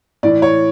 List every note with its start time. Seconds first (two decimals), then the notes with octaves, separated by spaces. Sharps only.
0.23 A2 E3 D5
0.42 C#5